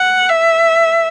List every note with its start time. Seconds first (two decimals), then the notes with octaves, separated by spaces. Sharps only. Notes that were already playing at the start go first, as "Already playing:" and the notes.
Already playing: F#5
0.29 E5